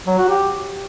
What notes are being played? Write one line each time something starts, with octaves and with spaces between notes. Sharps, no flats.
F#3
F#4
G4